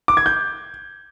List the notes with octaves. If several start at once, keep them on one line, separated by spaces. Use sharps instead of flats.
D6
G#6
G6